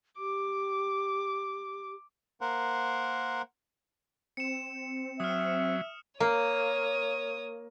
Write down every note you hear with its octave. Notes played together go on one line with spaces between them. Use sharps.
G4 D6
A#3 A#4 C5 F#5
C4 C#7 E7
F#3 E5 D#6 F6
A#3 C#5 D#6